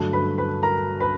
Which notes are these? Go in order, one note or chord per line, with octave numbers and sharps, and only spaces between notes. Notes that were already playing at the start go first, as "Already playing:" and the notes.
Already playing: G2 D3 F#3 A3
B4 B5
B4 B5
A#4 A#5
B4 B5